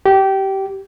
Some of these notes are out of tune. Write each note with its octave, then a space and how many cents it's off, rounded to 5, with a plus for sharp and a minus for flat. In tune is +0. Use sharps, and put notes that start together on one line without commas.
G4 -20